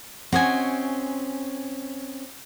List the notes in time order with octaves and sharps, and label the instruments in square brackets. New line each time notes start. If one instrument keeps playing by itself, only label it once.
[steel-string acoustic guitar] C4 C#4 [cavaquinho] F#4 D#5 G#5